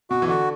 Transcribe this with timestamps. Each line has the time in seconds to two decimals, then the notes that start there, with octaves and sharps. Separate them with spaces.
0.10 B2 F#4
0.22 E3
0.28 D3 F#4